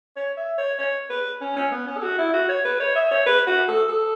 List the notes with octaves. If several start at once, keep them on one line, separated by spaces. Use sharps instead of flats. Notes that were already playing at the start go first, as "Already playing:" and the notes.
C#5
E5
C#5
C#5
B4
C#4
C#4
B3
C#4
A4
F#4
E4
F#4
C#5
B4
C#5
E5
C#5
B4
F#4
A4
A4